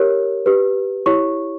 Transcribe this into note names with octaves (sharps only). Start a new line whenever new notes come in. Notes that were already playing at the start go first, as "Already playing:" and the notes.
Already playing: G4 A#4 C#5
G4 B4
E4 G4 C#5 C#6